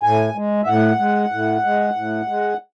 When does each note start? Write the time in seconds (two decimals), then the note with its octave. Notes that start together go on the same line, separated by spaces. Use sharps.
0.03 A2 G#5
0.35 G#3
0.64 E5
0.67 A2 F#5
0.99 G#3
1.32 A2
1.64 G#3
1.96 A2
2.28 G#3